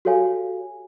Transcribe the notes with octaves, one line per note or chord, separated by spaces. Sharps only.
F#4 G4 A4 C#5 F5 G#5